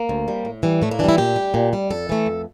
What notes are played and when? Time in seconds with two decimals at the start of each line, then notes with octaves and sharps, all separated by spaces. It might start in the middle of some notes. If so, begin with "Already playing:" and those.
Already playing: A#3
0.09 D2
0.28 C3 G3
0.45 A2
0.63 E3 G3
0.82 A2 A3
0.91 A#3
0.99 E3 D4
1.04 G3 E4
1.18 A#2 G4
1.36 G3
1.54 A#2
1.73 G3
1.90 F2 A4
2.09 E3 A3
2.26 F2